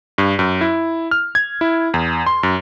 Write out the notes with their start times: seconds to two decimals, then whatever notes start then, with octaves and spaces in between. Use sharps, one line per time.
0.18 G2
0.39 F#2
0.61 E4
1.11 F6
1.35 G#6
1.61 E4
1.94 E2
2.26 C6
2.43 F#2